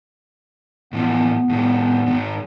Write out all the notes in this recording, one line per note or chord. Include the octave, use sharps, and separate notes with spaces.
A2 E3 F3 B3
A2 D#3
G#2 D#3